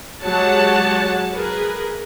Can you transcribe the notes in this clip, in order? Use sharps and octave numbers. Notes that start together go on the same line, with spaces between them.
F#3 G#3 G4 C#5 F#5 A5
G#4 A#4 B4